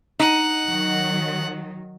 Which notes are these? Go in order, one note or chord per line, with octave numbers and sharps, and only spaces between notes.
D#4 F#5
D#3 F#3